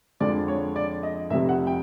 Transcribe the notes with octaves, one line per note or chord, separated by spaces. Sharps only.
F2 D3 F3 G#3 D5
C#5
D5
D#5
F1 F2 C3 E5
F#5
G5